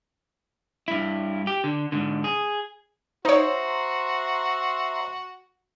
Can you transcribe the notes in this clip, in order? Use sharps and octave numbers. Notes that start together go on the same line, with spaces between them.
G2 E4
G4
D3
G#2 D3
G#4
D#4 F#4 C5 C#5 E5 A#5 C6